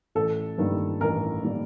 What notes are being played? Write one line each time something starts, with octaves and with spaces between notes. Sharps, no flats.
A1 A4
G2 D#3 G3 A#3
A1 A#4
D#3 G3 A#3